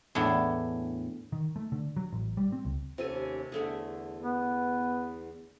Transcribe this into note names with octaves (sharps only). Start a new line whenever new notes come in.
E2 A2 D4
D#3
A3
D3
F#3
A1
G3
C4
C#2
D#2 C3 C#4 A4 G#5
E2 D3 A3 G#4
B3